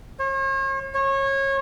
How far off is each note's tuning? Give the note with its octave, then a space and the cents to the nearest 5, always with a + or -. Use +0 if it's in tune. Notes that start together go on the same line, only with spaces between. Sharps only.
C#5 -45
C#5 -25